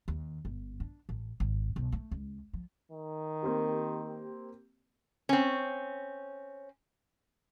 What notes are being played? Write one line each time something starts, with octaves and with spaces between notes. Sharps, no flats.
D#2
G1
D4
A1
G#1
B1
A3
C#2
F3
D#3
A#3 C4 G4
C4 C#4